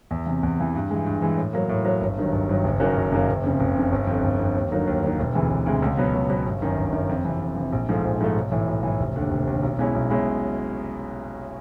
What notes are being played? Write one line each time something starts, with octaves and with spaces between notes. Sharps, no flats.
E2
C3 E3
E2
C3 E3
G2
E3 G#3
G2
E3 G#3
A2
F#3 A#3
A2
F#3 A#3
G1
G2 D#3 F#3
G1
G2 D#3 F#3
F#1
F#2 D#3 F#3 A#3
F#1
F#2 D#3 F#3 A#3
F#1
F2 C#3
F#1
F2 C#3
G1
F2 D3
G1
F2 D3
D#2
D3 F#3 A#3 D#4
D#2
D3 F#3 A#3 D#4
E1
D2 C3 E3 G#3
E1
D2 C3 E3 G#3
C#2
B2 F#3 B3
C#2
B2 F#3 B3
G1
F#2 D#3
G1
F#2 D#3
F2
C3 E3
F2
C3 E3
A#1
G#2 F3 A3
A#1
G#2 F3 A3
B1
A2 E3
B1
A2 E3
F1
D#2 D3
F1
D#2 D3
B1
B2 G#3 C#4 E4
B1
B2 G#3 C#4 E4